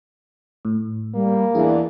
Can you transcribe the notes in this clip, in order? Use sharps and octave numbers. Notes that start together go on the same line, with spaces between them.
A2
G3 A#3
E2 E3 D4 G#4